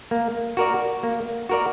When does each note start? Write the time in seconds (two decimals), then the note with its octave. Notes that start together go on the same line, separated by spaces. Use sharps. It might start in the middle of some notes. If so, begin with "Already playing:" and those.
0.11 A#3
0.57 F#4 A#4 D5
1.03 A#3
1.49 F#4 A#4 D5